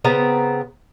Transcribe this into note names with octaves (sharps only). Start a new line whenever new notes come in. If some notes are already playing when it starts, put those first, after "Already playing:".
C#3 B3 C4 A#5